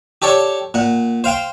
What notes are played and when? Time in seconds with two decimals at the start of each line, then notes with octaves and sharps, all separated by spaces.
0.22 G4 A4 C#5 D5
0.74 A#2 F#5
1.24 C5 F5 G5 C6